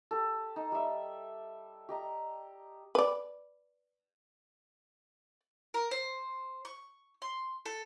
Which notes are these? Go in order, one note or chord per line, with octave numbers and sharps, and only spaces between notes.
G4 A4
D#4
G3 E5
G4 D#5 A#5
B4 D5
A#4
C5
C#6
C6
A4